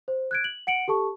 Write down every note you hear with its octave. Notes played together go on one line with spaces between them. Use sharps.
C5
F#6 G#6 D7
F#7
F#5 C#7 D7 F#7
G4 A4 A5 C#6